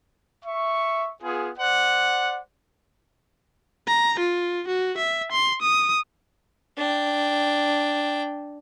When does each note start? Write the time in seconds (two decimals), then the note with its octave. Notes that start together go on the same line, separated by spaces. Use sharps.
0.45 E5 C#6
1.23 B3 F4 G#4
1.59 C5 D5 F#5
3.88 A#5
4.19 F4
4.68 F#4
4.97 E5
5.32 C6
5.62 D#6
6.77 D4 G5